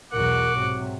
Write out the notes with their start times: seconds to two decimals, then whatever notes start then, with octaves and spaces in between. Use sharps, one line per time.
0.13 B1 E2 F#4 A#4 F#5 D6
0.55 G#2 C3 F#3 C4